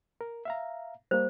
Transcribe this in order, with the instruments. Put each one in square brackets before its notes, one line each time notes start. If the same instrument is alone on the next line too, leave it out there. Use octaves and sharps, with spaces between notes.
[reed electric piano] A#4
E5 F5 A#5
[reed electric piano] G3 A#3 [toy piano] C5